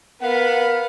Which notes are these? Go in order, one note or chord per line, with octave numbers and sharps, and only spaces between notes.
B3 A#4 F5 F#5 B5